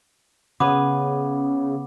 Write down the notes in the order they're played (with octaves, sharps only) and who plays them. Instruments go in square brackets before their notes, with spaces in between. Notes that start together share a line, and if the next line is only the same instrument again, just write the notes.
[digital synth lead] C#3 [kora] B3 G#4 [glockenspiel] D6